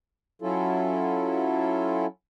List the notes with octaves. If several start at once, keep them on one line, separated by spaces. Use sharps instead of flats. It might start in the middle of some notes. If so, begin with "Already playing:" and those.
F#3 C#4 E4 F4 A4